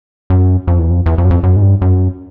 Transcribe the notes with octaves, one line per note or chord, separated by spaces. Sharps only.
F#2
F2
E2
F2
E2
F2
F#2
F2
F#2
G#2
G2
F#2